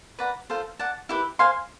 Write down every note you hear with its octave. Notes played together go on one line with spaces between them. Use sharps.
B4 D5 F#5 A#5
F4 A4 C5
D5 F#5 A5
E4 G4 B4
C5 F5 G#5 C6